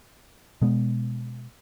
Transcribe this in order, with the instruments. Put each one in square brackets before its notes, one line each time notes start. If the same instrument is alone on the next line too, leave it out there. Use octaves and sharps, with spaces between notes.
[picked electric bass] B2 G#3 B3